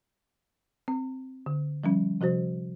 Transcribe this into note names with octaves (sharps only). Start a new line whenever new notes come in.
C4
D3
F3 G3 C#4
C3 F3 F#4 C5